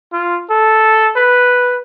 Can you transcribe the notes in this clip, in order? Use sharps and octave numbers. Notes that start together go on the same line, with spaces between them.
F4
A4
B4